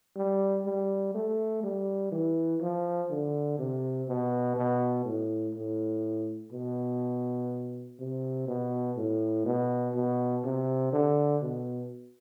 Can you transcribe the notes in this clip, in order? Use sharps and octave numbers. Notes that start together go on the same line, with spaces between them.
G3
G3
A3
G3
E3
F3
D3
C3
B2
B2
A2
A2
B2
C3
B2
A2
B2
B2
C3
D3
B2